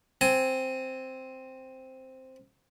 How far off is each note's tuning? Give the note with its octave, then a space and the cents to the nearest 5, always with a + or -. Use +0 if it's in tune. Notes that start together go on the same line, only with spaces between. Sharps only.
C4 +0 G#5 +15